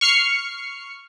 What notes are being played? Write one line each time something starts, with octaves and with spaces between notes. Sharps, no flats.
C#6 F6 C7 C#7